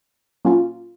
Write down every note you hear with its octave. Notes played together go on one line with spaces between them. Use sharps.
A#2 F#3 A#3 C#4 F4